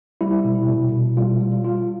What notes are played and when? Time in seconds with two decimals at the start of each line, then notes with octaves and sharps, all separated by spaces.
0.21 G3 E4
0.45 B2
0.69 B2
0.92 B2
1.17 G3 F4
1.41 G3
1.65 G3 F4